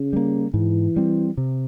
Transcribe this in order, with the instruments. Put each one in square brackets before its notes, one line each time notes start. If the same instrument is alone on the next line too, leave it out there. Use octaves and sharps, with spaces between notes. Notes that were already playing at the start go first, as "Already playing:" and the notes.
Already playing: [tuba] C#3
[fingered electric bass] G3 A#3
[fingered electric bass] G#2 [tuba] E3
[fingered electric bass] G3 C4
C3